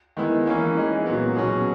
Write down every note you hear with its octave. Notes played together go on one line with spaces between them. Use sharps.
D#3 G#3 B3 E4
E3 A#3 C#4 E4
E3 G#3 D#4 G#4
A#2 F#3 B3
B2 F#3 C#4 G#4